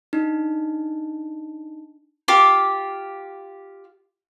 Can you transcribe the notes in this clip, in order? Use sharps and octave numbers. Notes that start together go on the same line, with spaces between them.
D4 D#4
F4 G4 D6